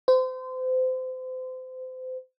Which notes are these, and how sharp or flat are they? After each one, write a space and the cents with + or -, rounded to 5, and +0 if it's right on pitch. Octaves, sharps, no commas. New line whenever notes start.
C5 -30